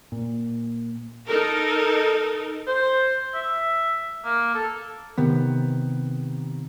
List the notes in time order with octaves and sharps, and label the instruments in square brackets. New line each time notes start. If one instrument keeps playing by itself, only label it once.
[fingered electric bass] A#2
[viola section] D#4 A4 A#4
[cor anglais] C5
E5
A#3
A4
[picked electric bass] C3 D#3 B3